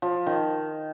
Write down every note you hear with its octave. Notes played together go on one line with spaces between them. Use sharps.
F3
D#3